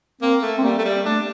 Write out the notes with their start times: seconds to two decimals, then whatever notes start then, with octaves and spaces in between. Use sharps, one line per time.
0.21 A#3 C4
0.42 A3
0.58 C4
0.63 G3 A#3
0.78 A3
0.85 G3
1.05 A3 D4